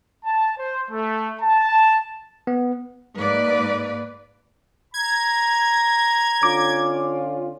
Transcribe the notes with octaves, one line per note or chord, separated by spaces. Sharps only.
A5
C5
A3
A5
B3
G#2 A#3 B4 D5
A#5 G#6
D3 C#4 F4 D6